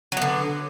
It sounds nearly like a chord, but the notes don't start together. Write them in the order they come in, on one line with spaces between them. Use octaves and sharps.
F#3 B3 D3